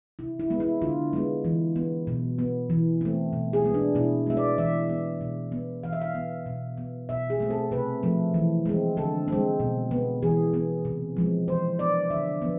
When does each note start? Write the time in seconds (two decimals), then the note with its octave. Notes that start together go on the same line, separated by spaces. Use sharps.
0.19 C3 E4
0.40 E4
0.50 G#3 B3
0.60 E4
0.82 D3 F4
1.13 G#3 B3
1.45 E3
1.76 B3
2.07 B2
2.39 B3
2.70 E3
3.01 A3 C4
3.33 B2
3.53 G#4
3.64 G#3 B3
3.74 D4
3.95 B2 E4
4.27 G#3 B3 E5
4.37 D5
4.58 E3 E5
4.89 B3
5.21 B2
5.52 B3
5.83 E3 F5
5.93 E5
6.02 F5
6.15 B3
6.46 B2
6.77 B3
7.09 B2 E5
7.30 G#4
7.40 A3 C4
7.50 A4
7.71 C3 B4
8.03 F3 A3
8.34 E3
8.66 G#3 C4
8.97 D3 A4
9.28 G#3 C4
9.60 B2
9.91 B3
10.23 E3 G#4
10.54 B3
10.85 C3
11.17 F3 G#3 C4
11.48 E3 C5
11.79 B3 D5
12.10 D3 E5
12.42 F3 B3